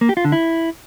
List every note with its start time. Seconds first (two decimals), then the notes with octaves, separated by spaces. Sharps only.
0.01 A#3
0.09 G4
0.17 F4
0.25 D3
0.32 E4